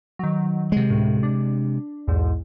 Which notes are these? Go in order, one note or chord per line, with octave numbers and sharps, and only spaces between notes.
D#3 F#3
C3 G#3
D2 A2
D4
B1 E2 G#2